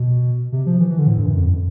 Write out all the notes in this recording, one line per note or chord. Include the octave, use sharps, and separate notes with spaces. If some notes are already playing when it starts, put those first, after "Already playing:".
Already playing: B2
C3
F3
E3
E3
D3
A2
G2
F#2
F2